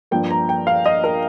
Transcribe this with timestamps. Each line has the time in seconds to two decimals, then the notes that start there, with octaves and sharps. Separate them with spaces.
0.11 G2 F3 A#3 G5
0.31 A#5
0.49 G5
0.67 F5
0.86 D#5
1.04 A#4